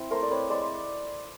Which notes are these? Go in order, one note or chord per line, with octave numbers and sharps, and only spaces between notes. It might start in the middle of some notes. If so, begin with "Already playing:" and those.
Already playing: C4 E4
A3 A#4 C5
D5
C4 B4 C#5
G#3 C5 D5